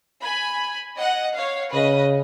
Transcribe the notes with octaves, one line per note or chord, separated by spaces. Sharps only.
G#5 B5
D#5 F#5
C#5 F5
C#3 B4 D#5